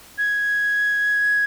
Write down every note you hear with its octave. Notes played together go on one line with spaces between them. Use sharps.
G#6